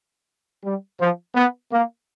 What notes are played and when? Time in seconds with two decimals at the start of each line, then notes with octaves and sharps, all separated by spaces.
0.64 G3
0.99 F3
1.35 B3
1.72 A#3